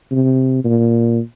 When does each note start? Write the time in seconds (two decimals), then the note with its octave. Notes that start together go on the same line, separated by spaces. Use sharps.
0.12 C3
0.64 A#2